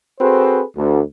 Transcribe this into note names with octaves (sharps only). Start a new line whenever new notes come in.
C4 F#4 G#4 A4 B4 C5
D2